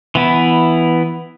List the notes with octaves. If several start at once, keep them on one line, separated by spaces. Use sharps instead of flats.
E3 B3 E4